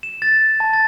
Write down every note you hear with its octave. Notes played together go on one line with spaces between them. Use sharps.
E7
A6
A5
A6